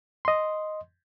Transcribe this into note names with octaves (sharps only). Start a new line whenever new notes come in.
D#5 C6